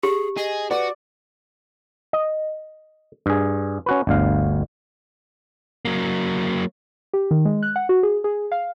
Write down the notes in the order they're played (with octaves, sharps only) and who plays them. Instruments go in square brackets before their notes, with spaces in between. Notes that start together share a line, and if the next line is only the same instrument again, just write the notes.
[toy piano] G4 [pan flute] G#4
[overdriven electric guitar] G#4 [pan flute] D#5
[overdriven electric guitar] F#4 [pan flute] B4 [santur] D5
[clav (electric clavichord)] D#5
G2 G#4
C#4 F#4 B4
G1 D2 F5
[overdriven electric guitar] F#3 A#3
[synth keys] G4
D#3
G#3
F#6
F#5
F#4
G#4
G#4
F5